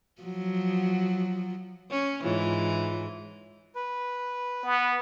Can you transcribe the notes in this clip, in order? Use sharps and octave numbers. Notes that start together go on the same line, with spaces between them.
F3 F#3
C#4
G#2 E3 E4 F4 C#5
B4
B3